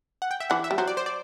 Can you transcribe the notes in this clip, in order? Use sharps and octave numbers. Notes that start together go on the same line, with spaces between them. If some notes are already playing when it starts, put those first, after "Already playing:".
F#5
G5
E5
E3 F#5
E5
G3
F#3 C5
D5
C5
D5